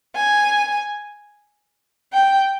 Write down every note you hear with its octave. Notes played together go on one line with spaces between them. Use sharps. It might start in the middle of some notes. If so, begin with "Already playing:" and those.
G#5
G5